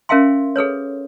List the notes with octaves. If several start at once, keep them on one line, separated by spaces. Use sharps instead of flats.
C#4 A#4 E5 F5 G5 C6
G#4 A4 B4 C#5